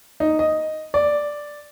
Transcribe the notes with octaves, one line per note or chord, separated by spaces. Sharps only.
D#4
D#5
D5